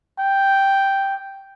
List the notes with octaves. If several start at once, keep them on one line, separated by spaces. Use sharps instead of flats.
G5